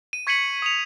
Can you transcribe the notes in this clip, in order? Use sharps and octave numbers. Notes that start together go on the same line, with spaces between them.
D#7
C#6 G#6 B6 C#7 D#7 F#7
D#6 C#7 F7